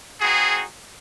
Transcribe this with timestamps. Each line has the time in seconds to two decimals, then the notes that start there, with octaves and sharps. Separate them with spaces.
0.20 C4 D#4 F#4 G#4